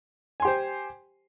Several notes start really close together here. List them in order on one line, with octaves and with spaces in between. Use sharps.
G#5 C6 G4 C5